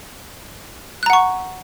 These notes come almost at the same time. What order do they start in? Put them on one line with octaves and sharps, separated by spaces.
F#6 A#5 F#5 C#6